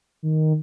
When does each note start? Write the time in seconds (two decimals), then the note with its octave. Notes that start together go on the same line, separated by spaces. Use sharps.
0.23 D#3